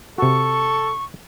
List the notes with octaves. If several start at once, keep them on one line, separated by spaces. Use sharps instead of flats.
C3 F#4 A4 C#6